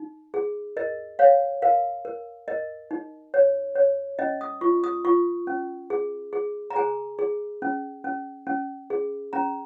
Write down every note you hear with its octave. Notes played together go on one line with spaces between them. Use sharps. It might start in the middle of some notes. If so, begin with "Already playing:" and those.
Already playing: D#4
G#4
A#4 D#5
C#5 F5
A#4 F5
A#4
A#4 D#5
D#4
C#5
C#5
C#4 D#5
D#6
F4 C#6
D#6
F4 C#6
C#4
G#4
G#4
A#5
G#4 G#5
G#4
C#4
C#4
C#4
G#4
C#4 A#5